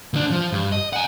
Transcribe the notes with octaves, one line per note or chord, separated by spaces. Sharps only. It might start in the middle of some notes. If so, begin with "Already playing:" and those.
D2 D4
F3
G2
D#5
F#5 G#5